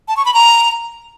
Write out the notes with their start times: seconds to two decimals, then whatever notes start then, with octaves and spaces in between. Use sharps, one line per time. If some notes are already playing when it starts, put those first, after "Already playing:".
0.08 A5
0.17 C#6
0.25 B5
0.34 A#5